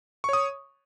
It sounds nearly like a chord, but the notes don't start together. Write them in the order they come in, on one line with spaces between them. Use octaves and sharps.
C#6 C#5 D#6